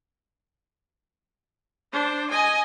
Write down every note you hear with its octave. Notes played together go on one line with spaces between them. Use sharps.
D4 C5
D#5 G#5